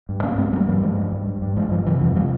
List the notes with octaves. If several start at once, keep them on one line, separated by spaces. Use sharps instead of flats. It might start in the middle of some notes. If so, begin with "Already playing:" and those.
G2
G2 A#3 C#4
G2 G#3 C4
G2 G3 A#3
G2 E3 G3
G2 F3 G#3
G2
G2
G2
G2
G2 F3 G#3
G2 F3
C3 E3
F2 F3
C3 F3 G#3